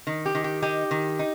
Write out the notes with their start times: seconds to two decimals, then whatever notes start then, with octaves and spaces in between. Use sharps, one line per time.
0.07 D#3
0.26 G4
0.35 D#3
0.44 G4
0.62 D#4 G4
0.91 D#3
1.19 D#4